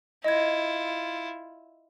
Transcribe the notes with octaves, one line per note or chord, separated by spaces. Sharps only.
E4 F4 D#5 G#6